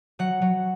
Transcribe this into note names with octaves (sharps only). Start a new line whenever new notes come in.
F#3 F#5
F#3